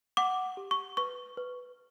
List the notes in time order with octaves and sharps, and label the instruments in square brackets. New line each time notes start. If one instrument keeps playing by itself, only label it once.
[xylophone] F#5 D6
G4
C#6
B4 C#6
B4